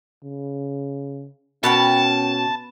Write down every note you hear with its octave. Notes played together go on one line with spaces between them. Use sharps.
C#3
B2 C#4 A#4 F#5 G5 A5